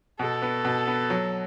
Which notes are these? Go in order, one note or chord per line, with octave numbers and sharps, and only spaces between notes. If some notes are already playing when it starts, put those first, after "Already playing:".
B2 A4
B3
B2
B3
F#3